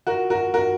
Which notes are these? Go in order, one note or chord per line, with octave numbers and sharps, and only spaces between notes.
F#4 A#4
F#4 A#4
F#4 A#4